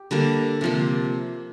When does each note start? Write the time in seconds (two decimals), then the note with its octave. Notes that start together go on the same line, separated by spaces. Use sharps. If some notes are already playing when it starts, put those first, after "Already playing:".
Already playing: G4
0.11 D3 G3 A#3
0.61 C3 F3 A#3